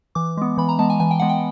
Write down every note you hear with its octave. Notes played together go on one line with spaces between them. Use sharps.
E3 D6
G#3 B3
E3 B5
A#5
G#3 B3 A5
G#5
E3 G#5
G5
G#3 B3 F#5
G5